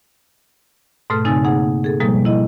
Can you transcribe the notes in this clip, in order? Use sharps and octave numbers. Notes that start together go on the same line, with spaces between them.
G#2 B2 A3 A4 F6
C#3 C4 D#4 G#5 E6 A6
A#3 D#4 G#4 F#5
G#4 A4
B2 F3 G3 G#3 A#3 A4
E4 D#5